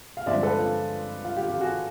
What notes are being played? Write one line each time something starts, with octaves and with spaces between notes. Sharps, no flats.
F5
G2 D3 F3 G#3 C4 D5 E5
A4 B4
F4
F4
F4 G4
F4 G4
F#4 G#4